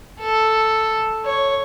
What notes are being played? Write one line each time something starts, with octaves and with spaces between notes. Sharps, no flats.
A4
C#5